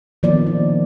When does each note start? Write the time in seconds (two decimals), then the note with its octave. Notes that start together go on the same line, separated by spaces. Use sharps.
0.23 D#3 F3 A#3 B3 D5
0.47 D#4